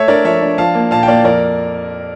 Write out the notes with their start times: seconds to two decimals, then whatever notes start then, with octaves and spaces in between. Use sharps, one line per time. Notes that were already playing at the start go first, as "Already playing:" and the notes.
Already playing: A3 C#5 E5
0.08 D4 A#4 D5
0.24 F3 C#5 E5
0.42 D4
0.58 F3 F5 A5
0.75 A#3
0.91 A#2 F5 A5
1.03 G5
1.08 A#3 D5 F5
1.24 F2 A#4 D5